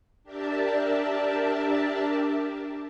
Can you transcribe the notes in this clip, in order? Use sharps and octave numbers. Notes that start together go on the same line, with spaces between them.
D4 G4 A#4 D5 E5 A5